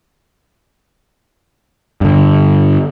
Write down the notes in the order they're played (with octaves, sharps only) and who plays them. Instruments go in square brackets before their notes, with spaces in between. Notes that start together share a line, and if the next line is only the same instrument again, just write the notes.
[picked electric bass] G2 D3